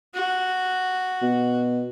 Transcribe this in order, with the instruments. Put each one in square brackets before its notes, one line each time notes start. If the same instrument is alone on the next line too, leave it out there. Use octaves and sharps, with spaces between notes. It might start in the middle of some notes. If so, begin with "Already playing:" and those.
[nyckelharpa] F#4
[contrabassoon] B2